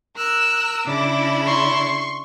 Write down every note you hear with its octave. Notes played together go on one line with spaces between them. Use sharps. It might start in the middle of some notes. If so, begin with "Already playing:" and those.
A#4 E6 F#6
C#3 D4 E4 D6
C6 C#6